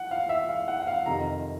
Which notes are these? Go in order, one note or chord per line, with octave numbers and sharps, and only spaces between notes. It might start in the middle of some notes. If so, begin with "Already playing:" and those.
Already playing: F#5
F5
E5
F5
F#5
F#5
F5
F2 C3 D#3 A#5